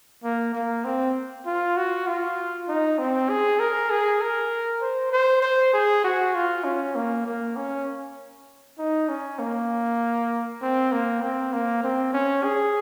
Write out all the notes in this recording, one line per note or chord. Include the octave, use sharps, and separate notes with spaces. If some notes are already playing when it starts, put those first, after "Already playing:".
A#3
A#3
C4
F4
F#4
F4
D#4
C4
G#4
A#4
G#4
A#4
C5
C5
C5
G#4
F#4
F4
C#4
A#3
A#3
C#4
D#4
C#4
A#3
C4
A#3
C4
A#3
C4
C#4
G#4